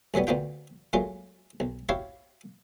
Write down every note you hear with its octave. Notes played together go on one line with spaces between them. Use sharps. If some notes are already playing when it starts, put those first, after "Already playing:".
C2 A2 F#3 G3 B3
D2 B3 D4 F4 G5
A#2 F#3 G#3 A3 F4
B1
E4 F#4 G4 C#5 F5